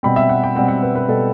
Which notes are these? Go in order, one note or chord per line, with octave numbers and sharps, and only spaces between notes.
B2 G3 C4 B5
E5
F#5
G5
B2 G3 C4 F#5
F#5
B4
B4
B2 G3 C4 A4